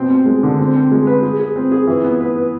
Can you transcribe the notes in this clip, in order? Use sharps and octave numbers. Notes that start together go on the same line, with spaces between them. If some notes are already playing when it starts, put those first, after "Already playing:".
Already playing: B2 C4
C4
G#3
D3
C4
C4
G#3
B4
G#4
G#4
C4
G#4
E3
B3
B4
B4